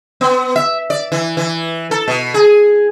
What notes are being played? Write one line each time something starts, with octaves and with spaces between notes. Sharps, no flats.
B3
E5
D5
E3
E3
A4
B2
G#4